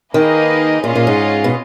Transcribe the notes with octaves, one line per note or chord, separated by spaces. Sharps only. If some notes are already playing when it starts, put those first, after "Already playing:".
D#3 A#3 D#4 G#4 B4 D#5
A#2 C#4 F4 G#4 D#5
A#2
G#2
B2